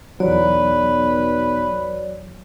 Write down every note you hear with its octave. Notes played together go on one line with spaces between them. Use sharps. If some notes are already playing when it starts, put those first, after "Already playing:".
B1 E2 F#3 F#4 B4 C#5 D5